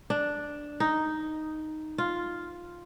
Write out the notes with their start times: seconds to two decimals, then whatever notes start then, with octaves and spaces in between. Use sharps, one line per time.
0.10 D4
0.80 D#4
1.98 F4